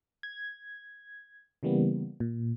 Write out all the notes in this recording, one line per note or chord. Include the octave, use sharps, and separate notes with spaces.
G#6
C#3 E3 G3 A#3 B3
A#2